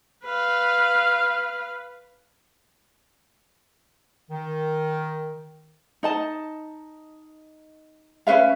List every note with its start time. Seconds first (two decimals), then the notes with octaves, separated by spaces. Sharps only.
0.24 B4 F5
4.31 D#3
6.03 D#4 D#5 A5
8.27 C#4 B4 E5 F5